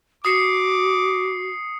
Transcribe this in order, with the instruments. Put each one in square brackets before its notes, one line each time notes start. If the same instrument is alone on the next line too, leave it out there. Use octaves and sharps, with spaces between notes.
[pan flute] F#4 [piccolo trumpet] D6 [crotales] D#6 C7 C#7